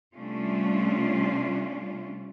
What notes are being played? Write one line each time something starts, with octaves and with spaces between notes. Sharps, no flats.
C3 G3 A3 C#4 D4 F4